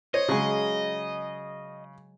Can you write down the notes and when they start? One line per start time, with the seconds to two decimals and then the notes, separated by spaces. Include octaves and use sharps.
0.14 C5 C#5 D#5
0.29 C#3 F#3 G#3